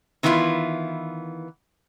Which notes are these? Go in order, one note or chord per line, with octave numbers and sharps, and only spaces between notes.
D#3 E3 B3 E4 F4